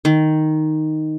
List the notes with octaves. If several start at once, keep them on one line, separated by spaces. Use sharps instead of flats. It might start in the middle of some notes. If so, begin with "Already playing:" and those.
D#3